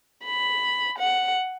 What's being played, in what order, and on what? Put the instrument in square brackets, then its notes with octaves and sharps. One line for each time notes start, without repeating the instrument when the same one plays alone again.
[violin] B5
F#5